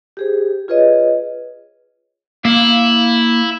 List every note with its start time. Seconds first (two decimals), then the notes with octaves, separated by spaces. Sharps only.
0.17 G4 G#4 C5
0.68 F4 G#4 B4 C#5 D#5
2.45 A#3 E4 F5